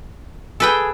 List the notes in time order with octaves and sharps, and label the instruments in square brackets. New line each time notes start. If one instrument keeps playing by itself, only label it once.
[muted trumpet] G#4 [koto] A4 B4 G5